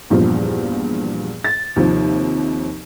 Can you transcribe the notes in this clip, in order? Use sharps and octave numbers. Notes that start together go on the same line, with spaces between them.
E2 G2 A#2 F3
A6
D#2 C3 F3